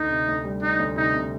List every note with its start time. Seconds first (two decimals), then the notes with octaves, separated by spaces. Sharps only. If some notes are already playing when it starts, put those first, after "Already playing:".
Already playing: D2 D#4
0.10 C3
0.28 D2
0.45 G3
0.62 G3 D#4
0.79 D2
0.96 C3 D#4
1.14 C3